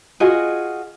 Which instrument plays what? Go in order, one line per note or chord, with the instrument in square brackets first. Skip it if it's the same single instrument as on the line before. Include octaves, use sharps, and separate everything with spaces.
[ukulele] F4 F#4 G#4 D#5